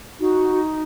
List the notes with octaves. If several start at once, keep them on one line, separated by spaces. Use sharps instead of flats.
D#4 F#4